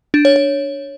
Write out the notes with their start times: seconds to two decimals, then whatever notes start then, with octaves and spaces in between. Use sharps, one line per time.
0.14 D4
0.25 C#5
0.36 C#5